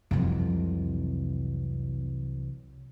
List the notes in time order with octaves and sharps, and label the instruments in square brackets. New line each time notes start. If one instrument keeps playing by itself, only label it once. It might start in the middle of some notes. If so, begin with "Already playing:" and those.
[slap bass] C2 E3 F#3 [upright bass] F2 C3